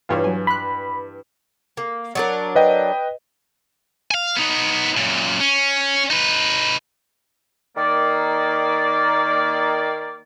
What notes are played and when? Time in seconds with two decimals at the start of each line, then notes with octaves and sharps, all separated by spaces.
0.09 G2 E3 F4 C#5 F5
0.24 F#3 G#5
0.47 B5 C6 F#6
1.77 A#3
2.15 F#3 D4 A#4
2.56 B4 D#5 G5
4.11 F5 G#5
4.36 B3 D#4
4.97 F#2 A#2
5.40 C#4
6.11 D#4 B4
7.77 D#3 A#3 D5